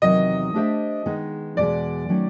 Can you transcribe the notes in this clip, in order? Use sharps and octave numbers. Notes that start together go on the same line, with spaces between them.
E2 C3 D#3 F#3 D#5
A3 D4 G4 C5 E5
D#3 G#3 B3 D#4
E2 B2 G#3 D5
D#3 F#3 A3 C#4